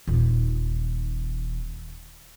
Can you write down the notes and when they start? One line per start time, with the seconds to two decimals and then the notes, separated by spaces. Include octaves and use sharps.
0.07 D#1 D#4